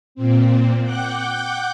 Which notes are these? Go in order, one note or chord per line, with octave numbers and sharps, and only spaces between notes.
A#2 C4
F#5 G5 D6 F#6 G6